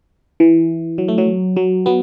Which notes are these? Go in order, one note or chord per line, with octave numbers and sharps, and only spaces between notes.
E3
F#3
A3
F#3
F#3
F#3 B3